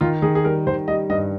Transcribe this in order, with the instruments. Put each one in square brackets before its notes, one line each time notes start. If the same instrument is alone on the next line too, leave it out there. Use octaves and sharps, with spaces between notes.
[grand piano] D#3 [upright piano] F4
[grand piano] D#3 [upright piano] G#4
[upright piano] G#4
[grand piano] G3 [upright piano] A#4
[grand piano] D#3 [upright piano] C5
[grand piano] G3 [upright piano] D#5
[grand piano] G2 [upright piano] D#5